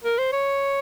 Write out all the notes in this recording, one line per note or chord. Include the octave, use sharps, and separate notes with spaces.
A#4
C5
C#5